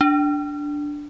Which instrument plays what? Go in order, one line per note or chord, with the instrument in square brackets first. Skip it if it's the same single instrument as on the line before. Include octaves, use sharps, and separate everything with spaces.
[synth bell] D4